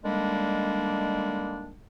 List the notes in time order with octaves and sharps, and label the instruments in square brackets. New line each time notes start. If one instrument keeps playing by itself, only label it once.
[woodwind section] D3 D#3 G3 G#3 A#3 D4